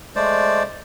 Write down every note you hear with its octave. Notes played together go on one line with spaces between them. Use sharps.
G#3 A3 C5 D5